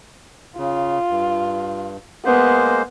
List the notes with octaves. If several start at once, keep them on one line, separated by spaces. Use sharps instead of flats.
C#3 F4
G2
G#3 A#3 B3 C5